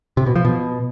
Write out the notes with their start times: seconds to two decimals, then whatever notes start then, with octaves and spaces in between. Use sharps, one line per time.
0.17 C3
0.26 B2
0.36 F3
0.45 B2